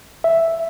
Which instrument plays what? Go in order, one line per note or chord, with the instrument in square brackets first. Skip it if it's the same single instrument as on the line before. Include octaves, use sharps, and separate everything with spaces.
[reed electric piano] E5